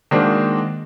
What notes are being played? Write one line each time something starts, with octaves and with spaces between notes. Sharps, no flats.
D#3 G#3 A#3 D4 F#4 C5